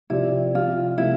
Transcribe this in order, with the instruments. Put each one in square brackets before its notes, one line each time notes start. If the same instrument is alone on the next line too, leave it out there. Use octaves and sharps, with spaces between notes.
[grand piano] C3 F3 C4 G4 D5 [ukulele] E4
[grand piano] C3 F3 C4 [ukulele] F4
[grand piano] C3 F3 A3 [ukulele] E4